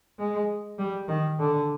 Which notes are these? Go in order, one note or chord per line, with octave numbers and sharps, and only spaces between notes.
G#3
G3
D#3
D3